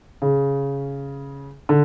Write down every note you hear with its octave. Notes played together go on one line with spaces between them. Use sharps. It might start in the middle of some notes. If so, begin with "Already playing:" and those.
C#3
D3